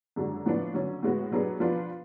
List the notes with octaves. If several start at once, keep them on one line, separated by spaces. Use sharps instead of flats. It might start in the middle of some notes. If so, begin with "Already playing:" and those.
F#2 D3 G#3 D4 F#4
A2 F3 B3 D4
D3 F#3 C#4
A2 G#3 B3 F#4
B2 F#3 B3 D4 G#4
F3 B3 D4 F4 B4